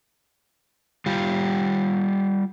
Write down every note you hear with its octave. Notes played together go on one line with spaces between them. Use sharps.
G3 F4